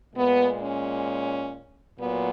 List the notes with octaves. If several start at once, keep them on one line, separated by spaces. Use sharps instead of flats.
A#2 G#3 B3
C#4
A#2 F#3 B3